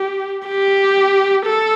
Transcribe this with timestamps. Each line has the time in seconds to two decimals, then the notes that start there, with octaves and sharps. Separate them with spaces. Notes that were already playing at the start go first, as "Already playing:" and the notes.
Already playing: G4
0.48 G4
1.46 A4